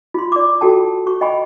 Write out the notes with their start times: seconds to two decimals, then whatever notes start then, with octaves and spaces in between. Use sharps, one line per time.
0.14 F4 C6
0.32 D5 D6
0.61 F4 F#4 A4 G5 A5
1.06 F#4 C#6
1.21 D#5 G5 G#5 B5 C#6